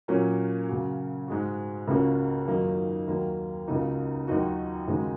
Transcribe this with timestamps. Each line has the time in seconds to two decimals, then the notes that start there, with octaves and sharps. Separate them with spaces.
0.08 A#2 F#3 A#3 C#4
0.68 C#3 F#3 A#3 F#4
1.28 G#2 G#3 F#4
1.88 C#2 C#3 A#3 C#4 F#4
2.48 F#2 D#3 F#3 A#3 D#4
3.08 D#2 D#3 F#3 A#3
3.68 C#2 C#3 A#3 D#4 F#4
4.27 D#2 D#3 F#3 D#4 F#4
4.88 D#2 C#3 G#3 D#4 F#4